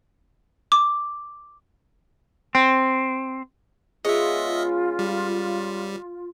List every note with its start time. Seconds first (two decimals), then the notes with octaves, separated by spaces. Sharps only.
0.72 D6
2.55 C4
4.05 G#3 B3 C#4 F4 D#5 E5
4.99 G3